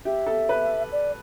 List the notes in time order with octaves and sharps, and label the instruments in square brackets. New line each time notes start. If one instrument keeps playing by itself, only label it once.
[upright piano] G4 [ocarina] E5
[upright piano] A4
B4
[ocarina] D5